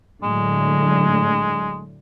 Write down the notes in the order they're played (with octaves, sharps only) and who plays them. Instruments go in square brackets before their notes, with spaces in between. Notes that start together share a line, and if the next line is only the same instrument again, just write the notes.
[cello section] A2 D3 F#3 [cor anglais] G#3